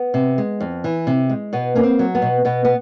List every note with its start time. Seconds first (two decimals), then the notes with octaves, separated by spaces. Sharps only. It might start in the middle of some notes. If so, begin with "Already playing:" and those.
Already playing: B3
0.14 C3
0.38 G#3
0.60 F2
0.84 E3
1.07 C3
1.30 G#3
1.53 B2 B3
1.75 A#3 C#4
1.83 C4
1.99 F#3
2.15 B3
2.22 B2
2.45 B2 B3
2.65 B3